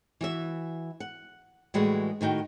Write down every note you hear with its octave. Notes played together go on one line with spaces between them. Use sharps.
E3 F#4 E5
F#5
A2 E3 G3 G#3 E4 F#4
A2 D#3 F#4 G5